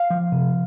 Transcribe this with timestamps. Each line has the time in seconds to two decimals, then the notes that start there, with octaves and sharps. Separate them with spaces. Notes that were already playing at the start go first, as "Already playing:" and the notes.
Already playing: F5
0.10 F3
0.32 C3